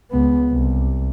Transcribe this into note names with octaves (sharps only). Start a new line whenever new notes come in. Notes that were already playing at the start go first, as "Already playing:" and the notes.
C#2 B3
C2